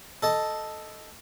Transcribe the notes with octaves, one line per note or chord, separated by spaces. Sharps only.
A4 D#5 A5